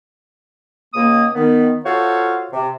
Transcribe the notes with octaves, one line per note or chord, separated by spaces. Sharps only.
C#2 A#3 D#6
D#3 B3
F4 F#4 A4 C5 C#5 F5
C3